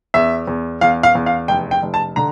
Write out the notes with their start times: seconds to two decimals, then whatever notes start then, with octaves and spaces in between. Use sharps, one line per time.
0.14 E2 E5
0.47 E2
0.81 E2 F5
1.03 F5
1.15 E2
1.26 F5
1.48 F1 G5
1.71 G5
1.83 F1
1.94 A5
2.16 D3 A#5